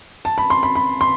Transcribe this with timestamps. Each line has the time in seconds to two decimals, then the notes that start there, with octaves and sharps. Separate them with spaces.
0.25 A5
0.38 B5
0.50 C6
0.63 B5
0.75 B5
1.01 C6